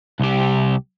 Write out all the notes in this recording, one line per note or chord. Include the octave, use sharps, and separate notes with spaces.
C2 G4